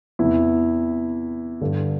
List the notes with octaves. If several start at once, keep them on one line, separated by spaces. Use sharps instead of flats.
E2 C3 E3 E4
G2 D3